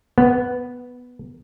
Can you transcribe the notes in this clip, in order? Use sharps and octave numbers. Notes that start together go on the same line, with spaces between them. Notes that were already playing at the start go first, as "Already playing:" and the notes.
B3